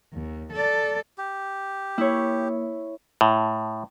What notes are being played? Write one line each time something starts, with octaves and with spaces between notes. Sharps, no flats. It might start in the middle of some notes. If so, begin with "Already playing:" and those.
D#2
A4 D5
G4
A#3 E4 C#5
A2